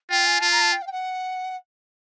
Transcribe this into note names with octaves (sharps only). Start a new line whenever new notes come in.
F4 G5
G#5
F4 A5
A#5
A5
G5
F5
G5
F#5